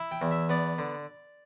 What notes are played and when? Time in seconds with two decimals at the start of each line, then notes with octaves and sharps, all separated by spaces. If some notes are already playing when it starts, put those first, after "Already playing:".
Already playing: E4
0.11 G5
0.22 E2
0.31 E5
0.49 B3 D5
0.79 D3